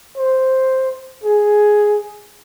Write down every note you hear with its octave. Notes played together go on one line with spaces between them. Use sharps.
C5
G#4